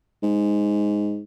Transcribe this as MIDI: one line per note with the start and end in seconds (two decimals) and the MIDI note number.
0.23 1.22 44